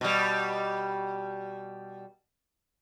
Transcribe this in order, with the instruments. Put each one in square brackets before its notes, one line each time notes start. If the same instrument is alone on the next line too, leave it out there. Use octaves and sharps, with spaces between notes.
[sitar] B2 G3